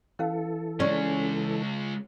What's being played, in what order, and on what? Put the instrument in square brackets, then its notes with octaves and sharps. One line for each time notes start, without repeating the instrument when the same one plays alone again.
[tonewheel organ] E3 A4 [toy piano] C#4 C5 F5
[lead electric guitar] C#3 G#3 [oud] C#4 [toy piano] D5